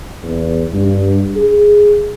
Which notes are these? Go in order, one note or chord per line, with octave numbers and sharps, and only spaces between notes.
E2
G2
G#4